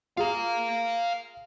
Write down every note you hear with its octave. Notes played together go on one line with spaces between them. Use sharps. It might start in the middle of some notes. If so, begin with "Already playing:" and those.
F4 G#4 F5 A#5